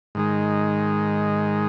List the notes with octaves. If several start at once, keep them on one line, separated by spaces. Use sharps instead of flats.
G#2 D#3 G#3